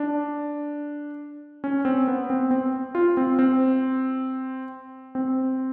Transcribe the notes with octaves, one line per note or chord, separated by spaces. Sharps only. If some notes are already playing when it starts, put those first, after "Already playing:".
Already playing: D4
C#4
C4
B3
C4
C4
F4
C4
C4
C4